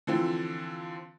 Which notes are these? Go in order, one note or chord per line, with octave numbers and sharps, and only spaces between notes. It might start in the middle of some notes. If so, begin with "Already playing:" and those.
D3 E3 F3 C4